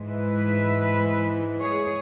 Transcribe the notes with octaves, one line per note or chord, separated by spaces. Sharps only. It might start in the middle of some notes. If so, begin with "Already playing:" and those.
Already playing: G#2 E3 G#3
B4 E5
G#4 C#5